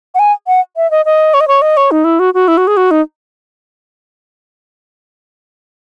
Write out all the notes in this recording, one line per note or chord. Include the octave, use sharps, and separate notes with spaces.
F#5
G#5
F#5
E5
D#5
D#5
C#5
D#5
C#5
D#5
C#5
D#4
E4
F#4
F#4
E4
F#4
G#4
F#4
D#4